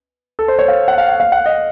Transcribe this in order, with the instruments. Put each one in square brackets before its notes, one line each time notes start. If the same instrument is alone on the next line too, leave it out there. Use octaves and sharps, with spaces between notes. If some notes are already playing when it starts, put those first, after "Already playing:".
[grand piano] A4
C5
C#5
F5
F#5
F5
F#5
F5
F#5
D#5